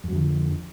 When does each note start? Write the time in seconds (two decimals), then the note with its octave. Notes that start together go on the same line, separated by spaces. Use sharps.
0.04 F2
0.08 F#3
0.12 D3
0.17 F3